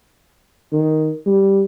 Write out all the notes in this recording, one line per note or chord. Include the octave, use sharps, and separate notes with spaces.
D#3
G3